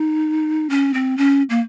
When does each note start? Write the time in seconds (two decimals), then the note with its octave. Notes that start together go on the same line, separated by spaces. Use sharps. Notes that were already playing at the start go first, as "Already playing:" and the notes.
Already playing: D#4
0.70 C#4
0.94 C4
1.18 C#4
1.50 A#3